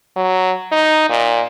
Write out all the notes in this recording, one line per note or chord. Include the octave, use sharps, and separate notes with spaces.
F#3
D#4
A#2